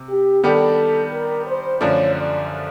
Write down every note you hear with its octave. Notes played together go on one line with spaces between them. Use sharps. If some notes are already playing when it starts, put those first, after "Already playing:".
Already playing: C3
G4
D#3 G3 B3 D4 G4 A4
A#4
C5
F#2 D3 F3 A3 D4 C#5
D5